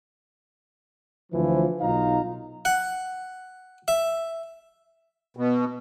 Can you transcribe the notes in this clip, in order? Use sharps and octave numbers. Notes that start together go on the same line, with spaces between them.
D2 E3 F3
B1 D#4 F4 F5 A#5
F#5
E5
B2